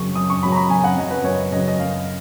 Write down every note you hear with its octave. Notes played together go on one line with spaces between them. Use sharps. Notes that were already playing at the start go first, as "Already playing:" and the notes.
Already playing: F#2 C#3 F#3 C#6
F#2 D#6
C#6
C#3 F#3 B5
A#5
B5
F#2 G#5
F#5
C#3 F#3 D#5
B4
F#2 C#5
C#3 F#3 D#5
D#5
F#2 F5